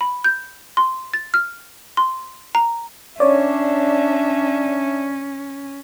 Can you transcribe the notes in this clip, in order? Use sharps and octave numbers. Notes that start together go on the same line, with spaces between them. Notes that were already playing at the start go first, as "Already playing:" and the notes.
B5
G6
C6
A6
F6
C6
A#5
C#4 D4 C#5 D5 E5